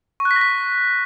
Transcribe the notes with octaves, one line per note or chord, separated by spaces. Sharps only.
C#6
F#6
B6
A#6
B6